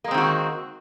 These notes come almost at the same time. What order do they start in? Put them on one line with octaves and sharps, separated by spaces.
A#3 G#3 C4 D#3 F#4